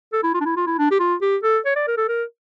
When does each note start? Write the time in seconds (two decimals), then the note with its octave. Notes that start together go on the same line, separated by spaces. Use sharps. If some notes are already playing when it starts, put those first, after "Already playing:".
0.13 A4
0.23 E4
0.34 F4
0.41 D4
0.45 E4
0.57 F4
0.67 E4
0.79 D4
0.91 G4
1.00 F4
1.22 G4
1.43 A4
1.65 C#5
1.76 D5
1.88 A#4
1.97 A4
2.08 A#4